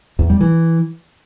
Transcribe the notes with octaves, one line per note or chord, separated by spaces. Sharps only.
E2
G3
E3